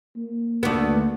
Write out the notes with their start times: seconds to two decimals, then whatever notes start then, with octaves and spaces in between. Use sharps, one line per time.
0.17 A#3
0.63 D2 B3